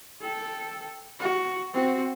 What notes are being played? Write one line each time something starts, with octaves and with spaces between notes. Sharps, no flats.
A4 G5
F#4
C4 F#4